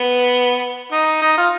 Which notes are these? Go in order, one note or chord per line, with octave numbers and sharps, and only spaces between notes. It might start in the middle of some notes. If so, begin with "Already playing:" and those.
Already playing: B3
D#4
D#4
F4